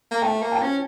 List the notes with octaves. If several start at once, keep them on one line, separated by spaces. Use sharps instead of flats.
A#3
A3 G5 A5
A#3
G5 A5
C#4